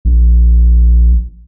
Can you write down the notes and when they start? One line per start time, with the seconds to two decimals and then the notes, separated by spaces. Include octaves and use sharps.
0.05 A#1